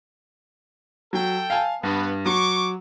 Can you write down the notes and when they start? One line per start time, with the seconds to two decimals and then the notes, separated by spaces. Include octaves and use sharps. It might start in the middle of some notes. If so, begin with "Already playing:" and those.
1.13 F#3 A4 G5
1.50 F5 G#5 A5
1.83 G2 B3
2.26 F#3 C#6 D6